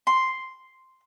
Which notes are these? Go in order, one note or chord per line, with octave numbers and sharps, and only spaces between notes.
C6